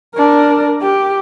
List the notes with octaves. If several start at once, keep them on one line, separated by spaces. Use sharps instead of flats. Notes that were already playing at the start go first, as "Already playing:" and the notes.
D4 A#4
G4